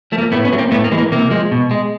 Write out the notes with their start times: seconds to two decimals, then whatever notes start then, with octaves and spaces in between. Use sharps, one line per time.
0.12 F3 A3
0.18 A#3
0.32 A2 A3 B3
0.44 B3 C#4
0.52 F#3 A3
0.58 A#3 C4
0.71 A2 A3 B3
0.84 A#3
0.91 E3 G#3
0.98 A#3
1.12 C3 A#3
1.31 F3 G#3
1.52 B2
1.71 G#3